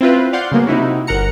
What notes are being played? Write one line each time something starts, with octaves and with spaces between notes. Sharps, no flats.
C4 E4 F4 B4
D5 F5 F#5 C6 G6
C#3 F#3 A#3 B3
C3 D#4 E4 F#4
G1 A#4 F#5 A#5 C#7